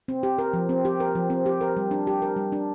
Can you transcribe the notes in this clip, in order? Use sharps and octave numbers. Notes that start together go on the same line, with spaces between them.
C4
G4
A#4
F3
C4
G4
A#4
F3
C4
G4
A#4
G3
D4
G4
A#4
G3
D4